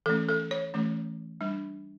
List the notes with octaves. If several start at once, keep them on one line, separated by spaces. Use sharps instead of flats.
E3 A3 C#4 A4
A4
C#5
E3 A3 C#4
G3 D4